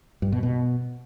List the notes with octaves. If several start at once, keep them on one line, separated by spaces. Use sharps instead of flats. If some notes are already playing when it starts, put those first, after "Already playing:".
G2
B2
B2